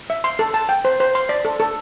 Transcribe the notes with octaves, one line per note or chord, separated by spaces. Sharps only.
E5
C6
A4
A5
G5
C5
C5
C6
D5
A4
A4